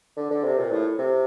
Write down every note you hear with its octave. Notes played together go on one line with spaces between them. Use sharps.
D3
D3
C3
A#2
A2
C3